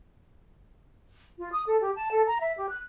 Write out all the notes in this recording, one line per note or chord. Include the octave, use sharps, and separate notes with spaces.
F4
D#6
A4
G4
A5
A4
A#5
E5
G4
F#6